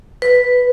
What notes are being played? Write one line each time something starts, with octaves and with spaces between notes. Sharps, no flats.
B4